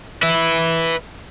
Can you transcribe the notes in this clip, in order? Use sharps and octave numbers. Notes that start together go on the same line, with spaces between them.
B4 E5